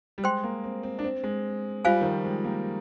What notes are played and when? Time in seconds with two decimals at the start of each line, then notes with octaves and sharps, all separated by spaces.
0.18 G3
0.24 G#3 C5 G5 C6
0.44 A#3
0.64 C4
0.83 C4
0.99 D4
1.04 C4
1.23 G#3
1.85 G3 F4 C5 F5 G#5
2.01 D#3
2.04 F3
2.25 G#3
2.44 A#3